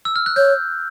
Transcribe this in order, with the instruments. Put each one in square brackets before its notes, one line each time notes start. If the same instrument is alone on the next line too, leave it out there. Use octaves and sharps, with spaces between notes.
[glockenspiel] E6
F6
F#6
[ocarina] C#5 [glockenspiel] G6